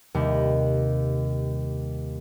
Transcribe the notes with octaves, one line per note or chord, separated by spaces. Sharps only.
D#2 C3 G3